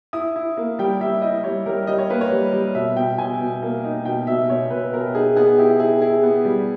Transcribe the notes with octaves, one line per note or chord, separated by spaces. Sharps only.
E4 D#6
E4
A#3
G3 G5
G3 E5
E4 D#5
G3 C#5
G3 A#4
G3 D#5
C#5
A#3 B4
C#5
G3
G3
B2 E5
B2 G5
B2 G#5
B2
A#3
D#4
B2 G5
B2 E5
B2 C#5
B2 B4
B2 A#4
D#4 G#4
B3 G#4
E4 G4
E4 G#4
E4 G#4
B3
G3